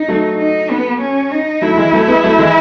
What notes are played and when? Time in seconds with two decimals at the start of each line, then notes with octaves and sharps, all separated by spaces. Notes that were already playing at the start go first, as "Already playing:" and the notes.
Already playing: D#4
0.08 F#3 A3
0.39 D#4
0.70 B3
1.01 C#4
1.32 D#4
1.62 F#3 A3 E4
1.77 E3 G#3
1.92 F#3 A3
2.07 G#3 B3
2.24 F#3 A3
2.39 E3 G#3